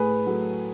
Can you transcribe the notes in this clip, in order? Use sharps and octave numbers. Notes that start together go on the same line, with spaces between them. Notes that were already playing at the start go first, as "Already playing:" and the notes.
Already playing: A2 G#4 B4
F#3 A3